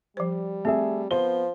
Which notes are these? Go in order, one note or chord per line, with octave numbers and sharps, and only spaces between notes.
F3 G3 C5
A3 C4 G#4 E5
F3 B3 C5 G7